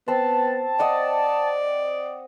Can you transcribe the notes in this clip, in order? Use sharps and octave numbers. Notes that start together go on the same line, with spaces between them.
B3 C4 A5 C6
D5 D#5 F#5